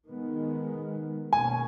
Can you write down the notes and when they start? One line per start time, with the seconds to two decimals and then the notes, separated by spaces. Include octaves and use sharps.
0.09 D#3 G#3 B3
1.33 B2 A#3 C#4 G#5